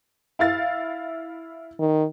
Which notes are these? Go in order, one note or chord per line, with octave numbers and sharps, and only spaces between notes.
E4 F5 A6
D#3